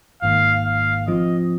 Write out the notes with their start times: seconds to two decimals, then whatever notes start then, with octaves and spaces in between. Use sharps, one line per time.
0.22 G#1 G#2 D#3 A#3 F5
0.65 F5
1.08 F3 C4 F4 D#5